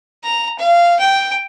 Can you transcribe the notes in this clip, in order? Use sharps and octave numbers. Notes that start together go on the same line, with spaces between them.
A#5
F5
G5